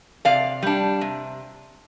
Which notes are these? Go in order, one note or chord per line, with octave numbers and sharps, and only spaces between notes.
C3 D5 F5
G3 D4
C3